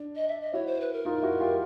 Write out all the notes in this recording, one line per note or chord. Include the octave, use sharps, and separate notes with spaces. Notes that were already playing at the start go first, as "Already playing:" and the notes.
Already playing: D4
D#5
E5
D#5
E4 F#4 C#5
C5
B4
A#4
D#4 F4
E4 F#4
F4 G4